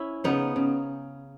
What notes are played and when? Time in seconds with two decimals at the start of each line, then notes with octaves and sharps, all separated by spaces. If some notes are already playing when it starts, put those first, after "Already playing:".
Already playing: C#4 E4
0.24 C#3 B3 D#4
0.56 C#3